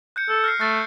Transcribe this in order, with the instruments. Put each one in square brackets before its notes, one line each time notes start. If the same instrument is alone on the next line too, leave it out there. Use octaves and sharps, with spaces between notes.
[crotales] F#6 G6 C#7
[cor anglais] A4
[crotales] F6 A#6 C7
[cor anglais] A3 [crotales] F#6 A6